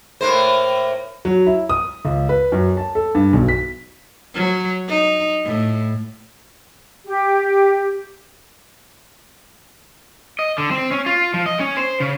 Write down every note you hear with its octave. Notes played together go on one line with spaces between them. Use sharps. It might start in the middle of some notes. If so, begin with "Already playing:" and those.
A2 A#3 C5
F#3
E4
D#6
C#2
B4
F#2
A5
A4
G2
B1
B6
F#3
D#4
A2
G4
D#5
D3
C4
C#4
F4
F3
D#5
C#4
C5
C#3